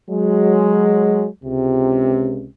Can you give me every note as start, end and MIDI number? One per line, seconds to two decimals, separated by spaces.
0.11 1.28 54
0.11 1.28 56
1.44 2.49 37
1.44 2.49 48